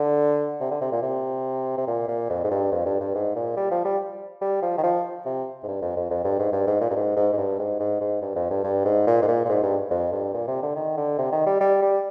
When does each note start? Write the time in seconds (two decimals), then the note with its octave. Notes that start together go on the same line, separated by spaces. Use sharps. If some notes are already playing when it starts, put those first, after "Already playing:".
Already playing: D3
0.60 C3
0.71 D3
0.81 C3
0.92 A#2
1.02 C3
1.77 C3
1.87 A#2
2.08 A#2
2.29 F2
2.44 G#2
2.51 G2
2.72 F2
2.86 G2
3.00 G2
3.14 G#2
3.36 A#2
3.57 G3
3.71 F3
3.85 G3
4.41 G3
4.62 F3
4.77 D#3
4.83 F3
5.25 C3
5.63 G#2
5.68 G2
5.82 F2
5.96 F2
6.10 F2
6.24 G2
6.39 G#2
6.52 G2
6.67 G#2
6.81 A#2
6.91 G2
6.95 G#2
7.16 G#2
7.33 G#2
7.37 G2
7.59 G#2
7.80 G#2
8.01 G#2
8.22 G2
8.36 F2
8.50 G2
8.64 G2
8.85 G#2
9.07 A#2
9.22 G#2
9.28 A#2
9.45 A#2
9.49 G#2
9.63 G2
9.91 F2
10.12 G2
10.34 A#2
10.47 C3
10.62 D3
10.76 D#3
10.97 D3
11.18 C3
11.32 D#3
11.46 G3
11.60 G3
11.82 G3